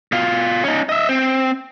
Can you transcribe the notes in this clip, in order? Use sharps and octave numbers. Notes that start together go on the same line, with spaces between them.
B2 F4
C#4 D#4
D#5 E5
C4